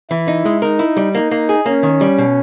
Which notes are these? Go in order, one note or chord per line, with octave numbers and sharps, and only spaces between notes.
E3 E4
D#4
G#3
D#4 A#4
E4
G3
A#3 D#4
A#3
G#4
A#3 C#4
D#3
G3
B2